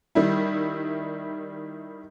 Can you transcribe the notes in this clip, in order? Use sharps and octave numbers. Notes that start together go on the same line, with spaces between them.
D#3 G3 E4